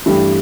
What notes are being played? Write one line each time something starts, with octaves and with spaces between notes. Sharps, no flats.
G2 E3 A3 D4 G4